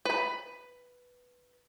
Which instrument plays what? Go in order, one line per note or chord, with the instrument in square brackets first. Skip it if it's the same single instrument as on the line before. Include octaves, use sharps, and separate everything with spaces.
[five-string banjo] B4 B5